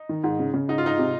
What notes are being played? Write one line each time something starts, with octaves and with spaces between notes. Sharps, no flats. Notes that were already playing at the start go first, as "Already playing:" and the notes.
Already playing: D#4
D#3
G#2
C#3
C#3
G#2 D#4
F4
G#2 D#4
C3